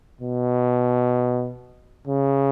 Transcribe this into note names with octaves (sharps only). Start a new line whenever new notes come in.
B2
C#3